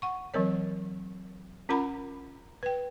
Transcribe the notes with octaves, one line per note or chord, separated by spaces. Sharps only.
F#5 C#6
E3 F#3 C4 A#4 C#5
C#4 F4 A#4 F#5 A#5 B5
B4 G5